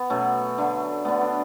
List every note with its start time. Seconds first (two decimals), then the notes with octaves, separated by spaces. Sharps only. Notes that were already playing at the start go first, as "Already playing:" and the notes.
Already playing: B3
0.10 B2 F#3 A3 C#4
0.58 D3 A3
1.05 D3 A3 B3
1.21 D4